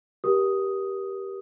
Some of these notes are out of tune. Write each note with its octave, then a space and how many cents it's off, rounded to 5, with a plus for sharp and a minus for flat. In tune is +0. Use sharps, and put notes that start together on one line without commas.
G4 -5 A#4 +35 D#6 +5